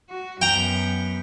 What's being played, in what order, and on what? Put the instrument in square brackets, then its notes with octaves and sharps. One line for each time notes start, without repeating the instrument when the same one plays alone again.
[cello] F#4
[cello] F#2 B3 [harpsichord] G5 A#5